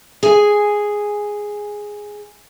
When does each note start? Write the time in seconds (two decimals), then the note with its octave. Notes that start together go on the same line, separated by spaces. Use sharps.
0.23 G#4 G#5